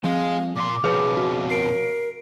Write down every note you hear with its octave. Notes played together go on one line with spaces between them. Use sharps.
F3 G#3 C4 F5
A#2 C6 D6
F2 B2 G#4 B4 C#5 F5
F#4
A#4 C7 D7